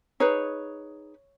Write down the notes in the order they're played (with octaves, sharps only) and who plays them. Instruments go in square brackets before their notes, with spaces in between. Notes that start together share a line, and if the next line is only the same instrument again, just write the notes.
[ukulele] D#4 G#4 B4 C#5